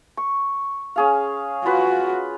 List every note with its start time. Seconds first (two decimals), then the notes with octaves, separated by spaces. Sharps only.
0.17 C#6
0.96 C#4 G#4 F5
1.66 F4 F#4 B4